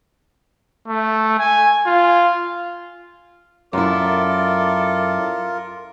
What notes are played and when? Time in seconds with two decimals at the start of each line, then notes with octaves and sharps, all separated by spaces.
0.88 A3
1.39 G#5
1.86 F4
3.73 F#2 E4 F4 A4 A#4 D5